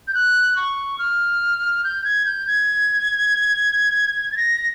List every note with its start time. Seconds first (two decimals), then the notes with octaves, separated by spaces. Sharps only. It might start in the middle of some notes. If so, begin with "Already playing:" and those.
0.08 G6
0.14 F#6
0.56 C#6
0.99 F6
1.84 G6
2.05 G#6
2.26 G6
2.47 G#6
4.32 A6
4.37 A#6